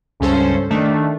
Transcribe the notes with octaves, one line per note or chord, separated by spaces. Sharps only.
C#2 G2 C#4 A4 C5
D#3 A3 D4